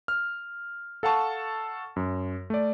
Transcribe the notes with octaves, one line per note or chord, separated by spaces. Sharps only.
F6
A4 F5 F#5 A5 C#6
F#2
A3 D5